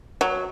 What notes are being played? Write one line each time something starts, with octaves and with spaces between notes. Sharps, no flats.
F#3